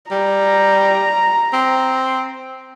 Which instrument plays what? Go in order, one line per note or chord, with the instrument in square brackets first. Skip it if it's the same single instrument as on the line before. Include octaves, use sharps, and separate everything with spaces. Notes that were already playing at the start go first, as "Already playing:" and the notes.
[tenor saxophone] G3 [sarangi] A#5
[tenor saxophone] C4